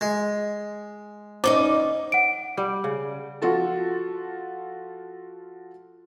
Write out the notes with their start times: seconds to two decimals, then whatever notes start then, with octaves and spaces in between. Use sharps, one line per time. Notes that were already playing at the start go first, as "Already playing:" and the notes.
0.01 G#3
1.44 E2 C#4 D#4 C5 D6
2.12 F#5 D7
2.57 G3
2.84 C#3
3.42 F3 F4 F#4 A4